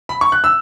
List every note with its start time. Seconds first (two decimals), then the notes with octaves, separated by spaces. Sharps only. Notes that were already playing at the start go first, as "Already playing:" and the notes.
0.09 B5
0.21 C#6
0.32 F#6
0.44 E6